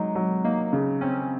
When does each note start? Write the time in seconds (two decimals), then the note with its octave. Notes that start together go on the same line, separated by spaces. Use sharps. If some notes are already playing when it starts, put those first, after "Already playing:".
Already playing: F#3 G#3 D#4
0.15 F#3
0.44 A#3 D#4
0.73 C#3
1.01 C4 C#4